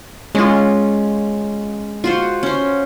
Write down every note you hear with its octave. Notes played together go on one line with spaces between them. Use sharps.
G#3 C#4 F4
F4 F#4 C5
C#4 C5